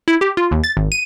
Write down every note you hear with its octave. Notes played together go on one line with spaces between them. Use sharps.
E4
G4
F4
D#2
A6
G#1
D#7